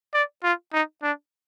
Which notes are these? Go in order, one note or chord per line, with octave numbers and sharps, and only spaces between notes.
D5
F4
D#4
D4